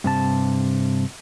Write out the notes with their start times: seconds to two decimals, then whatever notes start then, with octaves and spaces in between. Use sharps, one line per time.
0.04 G2 C3 A5